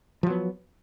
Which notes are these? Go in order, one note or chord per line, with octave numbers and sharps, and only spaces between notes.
F3 F#3 B3